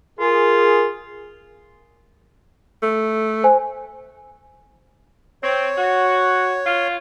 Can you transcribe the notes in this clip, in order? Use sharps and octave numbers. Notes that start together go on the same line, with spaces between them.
F4 G#4 A#4
A3
C5 G#5
C4 C#5
F#4
F4